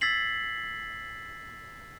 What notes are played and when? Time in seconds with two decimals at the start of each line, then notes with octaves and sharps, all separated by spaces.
0.01 E6 G#6 A6 B6 C7 F#7